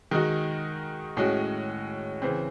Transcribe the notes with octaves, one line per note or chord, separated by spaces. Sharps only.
D#3 G#3 D#4 F#4
A2 G#3 C#4 F#4
C#3 E3 C4